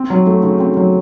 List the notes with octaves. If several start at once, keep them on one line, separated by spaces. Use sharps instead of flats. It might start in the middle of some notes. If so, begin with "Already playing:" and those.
Already playing: C4
F#3
A3
C#3
C4
F#3